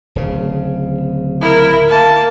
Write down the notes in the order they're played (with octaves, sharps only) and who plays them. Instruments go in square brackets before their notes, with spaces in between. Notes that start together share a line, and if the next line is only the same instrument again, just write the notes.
[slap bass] D1 C#3
[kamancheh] E4 A#4
A#3 A5